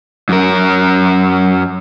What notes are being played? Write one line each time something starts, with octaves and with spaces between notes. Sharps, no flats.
F#2 A#4